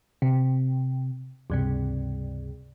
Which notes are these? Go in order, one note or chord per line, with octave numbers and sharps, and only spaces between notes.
C3
C#2 G2 C3